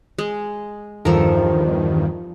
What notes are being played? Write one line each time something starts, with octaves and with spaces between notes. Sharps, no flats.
G#3
E2 G2 D#3 F3 A4 A#4